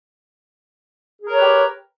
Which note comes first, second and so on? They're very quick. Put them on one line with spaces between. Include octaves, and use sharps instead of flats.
G#4 A#4 C#5 B4 G4